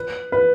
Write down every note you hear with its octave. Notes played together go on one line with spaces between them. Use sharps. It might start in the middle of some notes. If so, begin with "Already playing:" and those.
Already playing: B4
B4